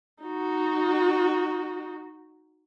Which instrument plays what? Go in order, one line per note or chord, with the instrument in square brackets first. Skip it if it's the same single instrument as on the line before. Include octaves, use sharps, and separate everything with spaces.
[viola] D#4 F#4